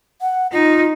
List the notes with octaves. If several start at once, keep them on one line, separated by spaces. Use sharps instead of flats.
F#5
D#4 F4